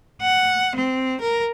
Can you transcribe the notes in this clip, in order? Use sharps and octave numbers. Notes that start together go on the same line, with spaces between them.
F#5
C4
A#4